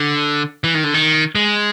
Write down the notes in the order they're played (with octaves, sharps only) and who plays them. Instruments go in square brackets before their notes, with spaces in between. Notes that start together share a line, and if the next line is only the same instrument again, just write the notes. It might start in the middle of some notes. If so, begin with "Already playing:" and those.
Already playing: [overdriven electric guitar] D3
E3
D#3
D3
D#3
G#3